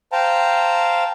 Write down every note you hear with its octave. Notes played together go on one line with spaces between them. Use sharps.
C5 F5 G5 A5 A#5